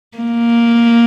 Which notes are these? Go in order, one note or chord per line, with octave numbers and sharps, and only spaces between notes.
A#3